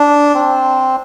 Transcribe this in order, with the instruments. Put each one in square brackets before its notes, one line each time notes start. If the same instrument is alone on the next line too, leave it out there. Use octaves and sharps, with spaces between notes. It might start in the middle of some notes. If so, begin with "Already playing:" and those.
Already playing: [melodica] D4
C4